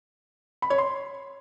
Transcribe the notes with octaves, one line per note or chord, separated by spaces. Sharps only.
B5
C#5
C6